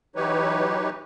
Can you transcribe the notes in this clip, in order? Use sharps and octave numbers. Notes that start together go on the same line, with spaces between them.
E3 F#3 D#4 G4 B4 C#5